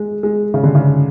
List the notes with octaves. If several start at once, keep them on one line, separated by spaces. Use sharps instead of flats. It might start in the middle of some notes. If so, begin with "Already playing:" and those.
Already playing: G#3
G#3
C#3
D3
C#3